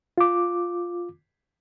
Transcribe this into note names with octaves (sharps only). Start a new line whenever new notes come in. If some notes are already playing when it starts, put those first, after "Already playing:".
F4 D6